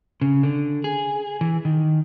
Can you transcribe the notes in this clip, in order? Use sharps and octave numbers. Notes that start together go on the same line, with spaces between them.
C#3
D3
G#4
E3
D#3